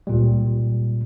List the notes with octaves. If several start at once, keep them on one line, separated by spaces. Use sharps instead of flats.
C#2 A#2 G3